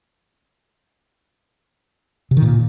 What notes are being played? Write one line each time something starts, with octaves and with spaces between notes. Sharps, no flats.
C3
D#3
A#2